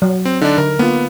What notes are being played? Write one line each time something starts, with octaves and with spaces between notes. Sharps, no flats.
F#3
C4
D3 D4 D#4
D3 A#4
A#3 B3 F4